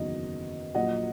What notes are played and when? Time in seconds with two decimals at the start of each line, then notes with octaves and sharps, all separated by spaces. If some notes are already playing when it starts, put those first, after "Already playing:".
Already playing: F#1 E2 D#3 F#3 D#5
0.75 A#1 A#2 F#3 D#5 F#5